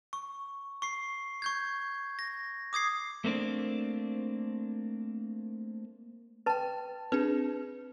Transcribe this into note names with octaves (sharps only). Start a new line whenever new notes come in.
C#6
C#6 C7
C#6 G6 G#6
A#6
D6 D#6 G#6 C7
A3 A#3 C4 D4
B4 G5 A5 A6
C4 D4 G#4 B4